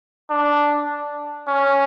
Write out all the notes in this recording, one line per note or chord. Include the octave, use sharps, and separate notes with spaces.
D4
C#4